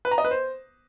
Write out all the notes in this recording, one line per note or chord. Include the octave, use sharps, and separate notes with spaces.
B4
A#5
D#5
B4
C5